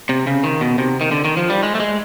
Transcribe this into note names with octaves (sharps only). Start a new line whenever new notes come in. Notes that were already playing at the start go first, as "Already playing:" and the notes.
C3
C#3
D#3
B2
C3
D#3
D3
D#3
F3
G3
G#3
A3
G#3